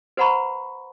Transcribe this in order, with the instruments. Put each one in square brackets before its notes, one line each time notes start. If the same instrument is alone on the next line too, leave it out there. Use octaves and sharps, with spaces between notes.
[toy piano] B4 C5 F#5 A#5 B5 C#6